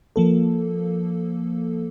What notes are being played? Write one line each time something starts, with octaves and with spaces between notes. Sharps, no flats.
F3 A#3 A4